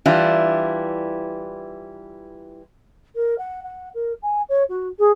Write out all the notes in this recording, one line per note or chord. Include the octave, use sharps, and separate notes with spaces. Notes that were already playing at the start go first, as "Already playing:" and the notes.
E3 G3 D4 E4 F4
A#4
F#5
F#5
A#4
G#5
C#5
F#4
G#4